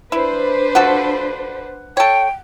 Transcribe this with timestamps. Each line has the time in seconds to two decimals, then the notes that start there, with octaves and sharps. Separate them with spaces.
0.12 D4 E4 B4 C5
0.75 F3 F#4 A4 F#5
1.97 A4 C#5 G5